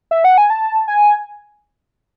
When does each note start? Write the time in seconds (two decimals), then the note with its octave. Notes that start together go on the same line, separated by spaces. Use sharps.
0.11 E5
0.24 F#5
0.38 G#5
0.50 A5
0.88 G#5